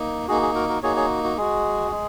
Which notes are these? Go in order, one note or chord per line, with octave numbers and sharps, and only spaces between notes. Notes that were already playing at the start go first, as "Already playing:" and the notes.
Already playing: A#3 D#4
A#3 D#4 F#4 G#4
G#4
F#4 A#4
F#4 A#4
A#3 D#4 F#4 G#4 C#5
G#4 C#5
F#4
G#3 F#4 G#4
G#3